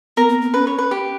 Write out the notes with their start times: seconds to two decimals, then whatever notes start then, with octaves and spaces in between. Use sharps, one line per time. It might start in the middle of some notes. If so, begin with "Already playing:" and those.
0.17 B3 A#4 A#5
0.29 B3
0.42 B3
0.54 C#4 B4
0.67 C#5
0.79 B4
0.91 G4